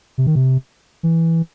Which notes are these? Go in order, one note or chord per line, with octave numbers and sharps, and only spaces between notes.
C3
D#3
C3
E3